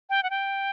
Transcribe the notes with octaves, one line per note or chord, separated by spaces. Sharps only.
G5
F#5
G5